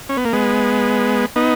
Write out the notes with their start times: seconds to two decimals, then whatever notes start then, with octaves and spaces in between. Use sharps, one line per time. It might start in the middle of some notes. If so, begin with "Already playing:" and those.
0.09 C#4
0.17 B3
0.25 A#3
0.33 G#3 B3
1.36 B3 D#4